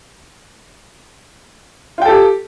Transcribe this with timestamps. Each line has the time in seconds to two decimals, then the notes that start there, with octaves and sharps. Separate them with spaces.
1.98 F4
2.02 G5
2.05 A4
2.09 G4